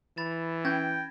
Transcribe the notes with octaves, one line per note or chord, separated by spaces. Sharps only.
E3 B5 A6 E7
C#4 G5 G6 G#6 A#6